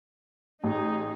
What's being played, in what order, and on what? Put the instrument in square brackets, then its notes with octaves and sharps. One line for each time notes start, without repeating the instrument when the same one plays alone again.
[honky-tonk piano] A1 [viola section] D#4 G#4